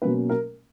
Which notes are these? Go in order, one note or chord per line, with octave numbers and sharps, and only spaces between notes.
B2 F#3 A#3 C#4 B4
A#4